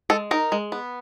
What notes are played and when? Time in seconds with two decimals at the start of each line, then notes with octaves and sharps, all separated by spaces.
0.10 G#3 A4
0.31 D#4 A#4
0.52 G#3
0.72 B3